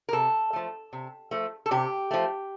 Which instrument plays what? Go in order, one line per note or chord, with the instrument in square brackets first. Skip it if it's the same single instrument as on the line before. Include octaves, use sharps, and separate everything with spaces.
[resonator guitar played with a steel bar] A#4
C3 A4
F3 A3
C3
F3 A3
A4
C3 G4
F3 A3